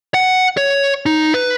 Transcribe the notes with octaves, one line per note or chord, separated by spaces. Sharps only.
F#5
C#5
D#4
B4